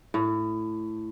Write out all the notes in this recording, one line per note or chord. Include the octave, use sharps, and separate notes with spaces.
A2